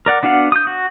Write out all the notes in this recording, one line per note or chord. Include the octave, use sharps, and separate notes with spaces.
A#4 D5 F#5
B3 D4 F#4 F5 F#5
D#6 G6
F#4